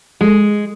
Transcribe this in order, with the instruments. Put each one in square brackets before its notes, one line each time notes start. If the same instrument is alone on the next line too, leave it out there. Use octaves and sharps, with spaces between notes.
[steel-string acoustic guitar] G#3